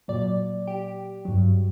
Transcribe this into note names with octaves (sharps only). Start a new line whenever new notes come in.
A#2 F#3 D5
G4
G2 F#3